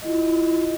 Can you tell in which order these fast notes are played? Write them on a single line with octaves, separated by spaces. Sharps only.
D#5 E4 F4